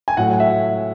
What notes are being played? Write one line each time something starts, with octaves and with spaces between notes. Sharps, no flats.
G#5
A2 F#3 F#5
E5